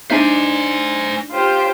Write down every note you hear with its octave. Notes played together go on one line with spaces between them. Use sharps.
D4 D#4 C5 E5 G#5
F4 G4 C5